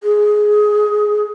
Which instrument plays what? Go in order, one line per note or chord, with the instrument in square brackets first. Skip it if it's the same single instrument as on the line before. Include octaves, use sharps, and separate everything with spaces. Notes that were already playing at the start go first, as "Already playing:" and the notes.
[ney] G#4